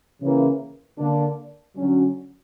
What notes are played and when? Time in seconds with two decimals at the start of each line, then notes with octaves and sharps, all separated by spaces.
0.21 C#3 E3 A#3
0.98 D3 A#3 D4
1.77 D3 F#3 C#4